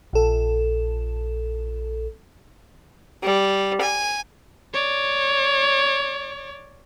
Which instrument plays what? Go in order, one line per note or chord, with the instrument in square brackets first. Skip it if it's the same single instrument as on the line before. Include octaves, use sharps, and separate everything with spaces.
[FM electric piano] A#1 A4
[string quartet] G3
G#5
[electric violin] C#5 D5